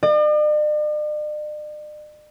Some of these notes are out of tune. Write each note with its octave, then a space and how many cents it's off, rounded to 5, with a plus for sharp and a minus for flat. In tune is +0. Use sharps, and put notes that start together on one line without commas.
D5 +45